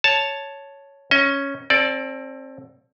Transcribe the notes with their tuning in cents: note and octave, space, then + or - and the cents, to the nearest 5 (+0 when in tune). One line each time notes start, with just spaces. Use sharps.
C#5 +0 A5 +0
C#4 +0 D#5 +35
C4 +30 A4 +0 D5 +0